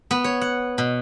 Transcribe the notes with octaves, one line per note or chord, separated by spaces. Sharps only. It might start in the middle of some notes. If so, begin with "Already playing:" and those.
B3
C#5
F#5
B2